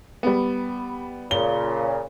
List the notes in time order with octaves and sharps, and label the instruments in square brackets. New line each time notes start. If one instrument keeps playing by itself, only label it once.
[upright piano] G3 B3
[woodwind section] A#2 C#3 [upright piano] G7